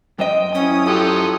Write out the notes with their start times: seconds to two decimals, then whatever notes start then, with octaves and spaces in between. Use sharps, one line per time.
0.19 F#2 C5 D#5 G5
0.55 C#4 E4 D#6
0.86 F3 F#3 G4 A4